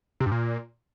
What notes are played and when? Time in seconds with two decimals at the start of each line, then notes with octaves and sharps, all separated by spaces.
0.20 C3
0.26 G2
0.32 A#2